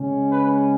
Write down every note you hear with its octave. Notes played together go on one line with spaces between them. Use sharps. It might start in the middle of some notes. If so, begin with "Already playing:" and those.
Already playing: C#3 G#3 C#4
B4